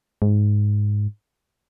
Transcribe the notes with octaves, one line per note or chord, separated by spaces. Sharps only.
G#2